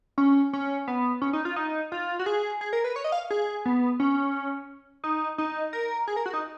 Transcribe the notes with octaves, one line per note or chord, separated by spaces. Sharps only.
C#4
C#4
B3
C#4
D#4
F4
D#4
F4
F#4
G#4
G#4
A#4
B4
C#5
D#5
F5
G#4
B3
C#4
D#4
D#4
A#4
G#4
A#4
F#4
D#4